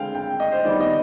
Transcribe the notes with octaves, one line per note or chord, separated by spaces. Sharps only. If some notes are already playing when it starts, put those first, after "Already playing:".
Already playing: D3 G#3 C4 F5 G5
G5
D#5
C5
D#3 G3 B3 D5
D#5